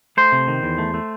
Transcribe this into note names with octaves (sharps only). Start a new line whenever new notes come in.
A3 C5
C3
D#3
E2
A3
A3